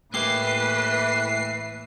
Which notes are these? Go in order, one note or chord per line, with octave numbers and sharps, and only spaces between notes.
A2 E3 A3 A#3 G4 B4 E5 C7